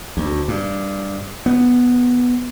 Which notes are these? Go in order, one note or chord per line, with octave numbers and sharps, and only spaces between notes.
D2
G2
B3